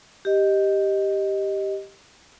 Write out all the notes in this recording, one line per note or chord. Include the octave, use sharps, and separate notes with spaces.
G4 D#5